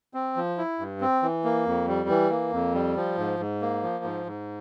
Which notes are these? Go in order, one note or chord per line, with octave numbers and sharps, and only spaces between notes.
C4
F3
E4
G2
C4
E3
A#3
F2
G3
E3
A#3
F2
G3
F3
G#2
G#2
A#3
F3
G#2
G#2